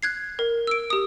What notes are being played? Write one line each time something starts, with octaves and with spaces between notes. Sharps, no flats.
F#6 G#6 C7
A#4
E6 D7
G4 D#6